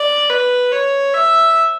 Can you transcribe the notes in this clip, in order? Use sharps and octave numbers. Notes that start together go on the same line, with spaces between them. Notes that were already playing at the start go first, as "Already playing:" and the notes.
Already playing: D5
B4
C#5
E5